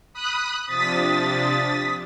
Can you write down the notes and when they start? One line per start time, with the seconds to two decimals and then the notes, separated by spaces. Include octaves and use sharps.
0.13 B5 D#6 F#6
0.67 C3 F3 D4 D#6 A6 B6